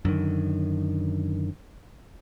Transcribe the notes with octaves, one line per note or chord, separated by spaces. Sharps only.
F#2 D3 D#3